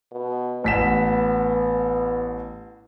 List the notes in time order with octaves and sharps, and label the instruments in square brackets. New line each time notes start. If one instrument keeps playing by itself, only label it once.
[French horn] B2
[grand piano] A1 B6 E7 [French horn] B3